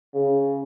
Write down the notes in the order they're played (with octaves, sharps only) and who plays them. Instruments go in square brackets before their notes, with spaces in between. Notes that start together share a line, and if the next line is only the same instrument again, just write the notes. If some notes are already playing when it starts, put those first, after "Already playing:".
[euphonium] C#3